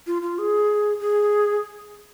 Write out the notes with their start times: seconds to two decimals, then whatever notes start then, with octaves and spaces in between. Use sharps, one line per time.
0.07 F4
0.22 F4
0.38 G#4
1.00 G#4